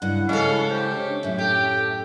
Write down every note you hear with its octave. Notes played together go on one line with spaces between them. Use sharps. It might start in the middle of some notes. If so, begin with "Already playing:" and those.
G2 C#3 E4 F#5
C#3 G#3 C#4 A4 F5
G4 C5
D4
F#2 A2 E5
G4 A4 G5